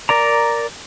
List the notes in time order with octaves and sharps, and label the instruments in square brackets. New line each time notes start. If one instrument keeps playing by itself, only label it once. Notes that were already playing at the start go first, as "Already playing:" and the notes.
[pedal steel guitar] A#4 D5 A#5